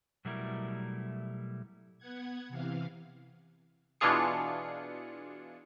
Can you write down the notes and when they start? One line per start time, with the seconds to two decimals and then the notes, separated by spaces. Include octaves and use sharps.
0.25 B2 F#3 G3 A3 E4 A#4
1.98 B3 F#5 G#6
2.48 C3 E3 F5
4.01 B2 E3 D4 F4 G#4 C#7